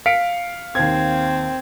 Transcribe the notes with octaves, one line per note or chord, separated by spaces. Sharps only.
F5 B6 C#7 D7
D#2 C4 G#6